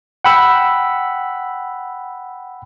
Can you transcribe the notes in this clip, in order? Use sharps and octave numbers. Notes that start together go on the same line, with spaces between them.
F#5 G5 B5 E6